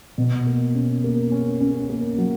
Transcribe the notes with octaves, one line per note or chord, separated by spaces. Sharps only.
B2
A#3
C#4
A#3
C#4
C#4
A#3
F#3